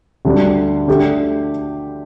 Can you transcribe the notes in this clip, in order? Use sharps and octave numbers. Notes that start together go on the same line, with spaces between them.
D2 D3 G3 D4
D3 A3 G4